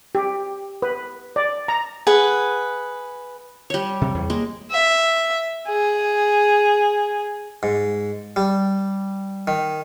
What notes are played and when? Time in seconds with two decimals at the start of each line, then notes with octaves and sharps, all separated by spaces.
0.15 G4
0.82 B4
1.36 D5
1.68 A#5
2.07 G#4 B4 F#5
3.70 G3 C#5
4.01 C3
4.14 E2
4.30 G#3 A#3
4.71 E5
5.67 G#4
7.63 G#2
8.36 G3
9.47 D#3